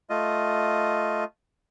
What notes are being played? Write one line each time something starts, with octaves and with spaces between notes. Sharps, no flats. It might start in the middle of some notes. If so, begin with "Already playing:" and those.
A3 F4 D#5